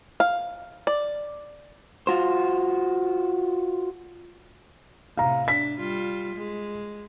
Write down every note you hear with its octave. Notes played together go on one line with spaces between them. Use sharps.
F5
D5
F4 F#4 C5
A2 C3 F5 A#5
D4 B6
G3 F4
G#3